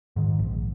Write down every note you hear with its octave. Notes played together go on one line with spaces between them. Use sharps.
G#2 D#3
A#1